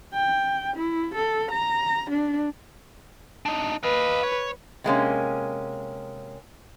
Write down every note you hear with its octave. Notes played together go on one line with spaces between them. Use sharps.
G5
E4
A4
A#5
D4
D4 D#4
B4 D#5 F5
C#5
C3 G#3 A#3 C#4